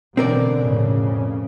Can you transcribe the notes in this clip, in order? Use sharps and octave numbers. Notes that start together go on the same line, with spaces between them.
B2 D3 E3 C4 A#4 D5
F2 A2 C#3